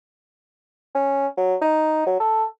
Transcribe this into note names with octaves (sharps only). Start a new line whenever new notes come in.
C#4
F#3
D#4
F#3
A4